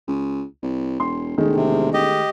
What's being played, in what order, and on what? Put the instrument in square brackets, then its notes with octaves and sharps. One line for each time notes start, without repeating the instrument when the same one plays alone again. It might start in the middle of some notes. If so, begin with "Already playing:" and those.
[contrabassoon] C#2
C2
[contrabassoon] E1 [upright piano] C6
[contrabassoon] E1 [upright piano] D#3 G#3 A3
[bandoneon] C3
G4 D#5